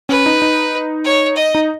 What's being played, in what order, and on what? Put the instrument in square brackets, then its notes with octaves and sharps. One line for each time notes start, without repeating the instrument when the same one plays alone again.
[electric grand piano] C#4 [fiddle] B4
[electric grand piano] D#4
D#4
[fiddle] C#5
D#5
[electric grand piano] D#4